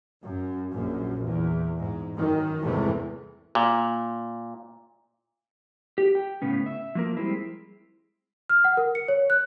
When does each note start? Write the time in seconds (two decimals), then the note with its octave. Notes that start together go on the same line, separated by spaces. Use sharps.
0.22 F#2
0.72 A#1 F#2
1.25 E2
1.77 G#2
2.14 F#2 D#3
2.60 G1 E2 C3 E3 G#3 A3
3.55 A#2
5.98 G4
6.15 G5
6.42 A2 C#3 B3 C#4
6.66 E5
6.95 F3 A#3 A#4
7.17 G3 G#3 C4 E4
8.49 F6
8.64 F#5
8.77 A#4
8.95 C#7
9.08 C#5
9.30 F#6